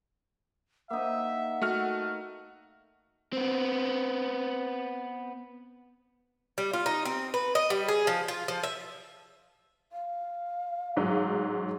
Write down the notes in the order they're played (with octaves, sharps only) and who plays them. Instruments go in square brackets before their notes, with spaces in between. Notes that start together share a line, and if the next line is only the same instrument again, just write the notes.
[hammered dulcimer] A#3 D#4 [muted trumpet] E5 [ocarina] F#5
[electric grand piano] A3 F#4 F6
[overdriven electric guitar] B3 C4
[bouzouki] G3
F4
D#4
C4
B4
D#5
G3
G#4
F3
F4
F3
E5
[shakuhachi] F5
[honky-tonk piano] A1 G#2 F#3